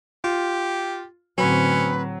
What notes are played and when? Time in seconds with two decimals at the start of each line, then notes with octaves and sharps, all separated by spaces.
0.24 F4 G4
1.38 A2 D3 F#3 C4 C#4 B4